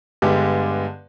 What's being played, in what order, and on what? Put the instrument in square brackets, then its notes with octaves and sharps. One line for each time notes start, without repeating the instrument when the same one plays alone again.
[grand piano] G2 D3 G#3 B3 G4